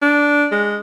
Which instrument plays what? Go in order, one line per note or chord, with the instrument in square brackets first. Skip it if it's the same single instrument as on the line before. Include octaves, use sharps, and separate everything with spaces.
[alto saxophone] D4
G#3